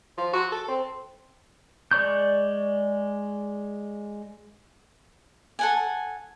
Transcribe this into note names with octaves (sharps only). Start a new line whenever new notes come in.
F3
F#4
A4
C4
G#3 D5 C#6 G6
A4 F#5 G#5